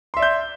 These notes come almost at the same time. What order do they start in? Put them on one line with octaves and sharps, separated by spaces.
C6 E5 D5 G6